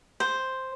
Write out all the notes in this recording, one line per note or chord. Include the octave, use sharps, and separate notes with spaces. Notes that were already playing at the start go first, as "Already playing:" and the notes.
C5